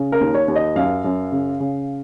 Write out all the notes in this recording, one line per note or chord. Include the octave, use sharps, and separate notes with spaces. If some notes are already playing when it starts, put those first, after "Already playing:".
Already playing: C#3
A#4
D#2
C#5
D#2
D#5
F#2 F5
F#2
C#3
C#3